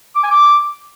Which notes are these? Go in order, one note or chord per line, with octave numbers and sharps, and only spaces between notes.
D6
G#5
D6